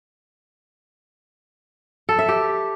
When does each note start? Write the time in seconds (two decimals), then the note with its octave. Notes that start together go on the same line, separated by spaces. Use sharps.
2.09 A4
2.19 E5
2.29 G4